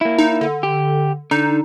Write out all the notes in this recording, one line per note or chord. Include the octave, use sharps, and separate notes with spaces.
A#3 E4
D#4
D3
G4
D3 D#4